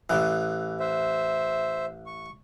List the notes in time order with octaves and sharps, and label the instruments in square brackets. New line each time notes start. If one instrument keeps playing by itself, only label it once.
[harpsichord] A1 E3
[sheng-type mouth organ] C5 E5
C#6